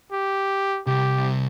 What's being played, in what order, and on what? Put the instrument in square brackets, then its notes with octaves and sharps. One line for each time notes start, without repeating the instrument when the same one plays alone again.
[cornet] G4
[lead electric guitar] C2 [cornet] G4